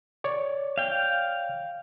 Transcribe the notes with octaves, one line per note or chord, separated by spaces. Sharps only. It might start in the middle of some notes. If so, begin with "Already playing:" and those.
C#5 D5
F5 G5